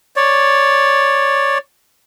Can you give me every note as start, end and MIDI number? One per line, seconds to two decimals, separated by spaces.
0.16 1.58 73
0.16 1.58 74